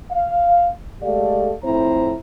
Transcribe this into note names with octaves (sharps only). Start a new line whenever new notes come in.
F5
G#3 A3 G4 A4 D5 F5
F2 A2 C4 E4 C5 A#5